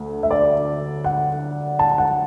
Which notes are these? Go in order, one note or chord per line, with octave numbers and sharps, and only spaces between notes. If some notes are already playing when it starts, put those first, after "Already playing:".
Already playing: D2 D3 A3
E5
D5
F#5
A5
F#5